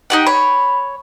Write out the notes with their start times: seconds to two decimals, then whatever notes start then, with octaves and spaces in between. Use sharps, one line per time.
0.10 D#4 G4 F#5
0.26 C#5 B5